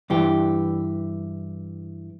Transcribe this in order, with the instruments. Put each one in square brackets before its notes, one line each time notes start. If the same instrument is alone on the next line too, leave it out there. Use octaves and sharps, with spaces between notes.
[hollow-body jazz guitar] G2 E3 G4